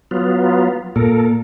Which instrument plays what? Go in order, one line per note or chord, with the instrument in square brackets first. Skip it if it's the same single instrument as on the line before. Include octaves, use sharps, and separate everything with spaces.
[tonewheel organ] F#3 B3 F4
[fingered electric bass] A#2 [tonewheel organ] A4 A#4